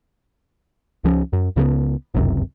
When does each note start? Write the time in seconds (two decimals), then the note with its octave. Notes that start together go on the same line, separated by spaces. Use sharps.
1.04 C#2 F3 C#4
1.33 F#2
1.56 C#2 C#3 F3 B3
2.14 G1 C#2 F#2 C3